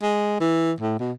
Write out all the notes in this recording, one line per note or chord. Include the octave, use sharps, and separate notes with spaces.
G#3
E3
A2
B2